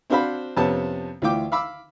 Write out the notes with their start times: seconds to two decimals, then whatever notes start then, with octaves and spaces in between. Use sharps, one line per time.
0.10 C4 D4 F#4 C5 F5 B5
0.57 F2 C3 B3 C#4 A5
1.22 D2 E3 F4 G5 D6
1.52 F5 B5 D6 E6